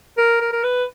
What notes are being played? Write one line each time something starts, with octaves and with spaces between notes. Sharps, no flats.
A#4
A#4
A#4
B4